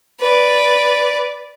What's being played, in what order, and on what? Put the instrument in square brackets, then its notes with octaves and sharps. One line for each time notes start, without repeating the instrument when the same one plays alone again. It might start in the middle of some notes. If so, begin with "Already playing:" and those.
[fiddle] B4 D5